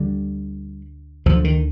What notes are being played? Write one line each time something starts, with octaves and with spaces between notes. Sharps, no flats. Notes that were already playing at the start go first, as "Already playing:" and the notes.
Already playing: D2 D3 G3
D2 D3 F3
D#3